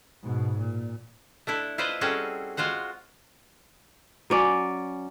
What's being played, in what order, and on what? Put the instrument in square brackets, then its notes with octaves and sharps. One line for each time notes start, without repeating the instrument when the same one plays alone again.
[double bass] G#2 B2
A#2
[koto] A3 D4 E4 A4
E4 F4 B4 C5 D5 D#5
G3 C4 C#4 F#4 G#4 A4
G#3 F4 F#4 C5 F#5
[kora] F#3 C#4 D5